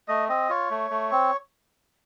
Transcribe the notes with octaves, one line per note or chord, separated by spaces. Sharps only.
A3 D#5
C4 D#5
F4 C#5
A3
A3
C4